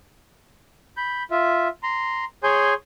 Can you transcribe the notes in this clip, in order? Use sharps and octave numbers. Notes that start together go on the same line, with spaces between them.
B5 G6
F4 E5
A#5 C6
G#4 C#5 G#5 C6 G6